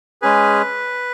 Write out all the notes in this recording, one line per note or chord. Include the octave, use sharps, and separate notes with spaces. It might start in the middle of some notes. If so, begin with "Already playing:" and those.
G#3 C#4 G#4 B4